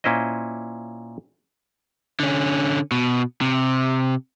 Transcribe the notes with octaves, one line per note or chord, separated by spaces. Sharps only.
A#2 C#4 E4 C5 D#5
D3 C#4
B2
C3